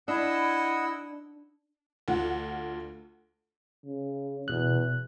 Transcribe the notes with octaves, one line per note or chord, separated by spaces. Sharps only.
D4 E4 D#5 F#5 E6
D2 F4 F#5
C#3
E2 B2 F#6